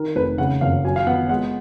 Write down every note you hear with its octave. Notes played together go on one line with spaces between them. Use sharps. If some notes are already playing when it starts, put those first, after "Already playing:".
Already playing: D#3 A#4
F1 B4
C#3 F#5
F#1 F5
F#3 G#5
F5
B3 F#5
G#3 F#5